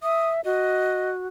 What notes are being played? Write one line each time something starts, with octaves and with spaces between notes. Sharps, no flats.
E5 D#6
F#4 D#5